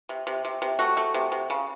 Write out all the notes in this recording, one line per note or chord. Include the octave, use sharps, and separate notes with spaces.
C3
C3
C3
C3
A3 F#4
A3
C3
C3
C#3